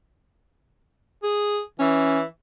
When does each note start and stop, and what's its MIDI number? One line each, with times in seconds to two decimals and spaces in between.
1.23 1.60 68
1.79 2.23 52
1.79 2.20 61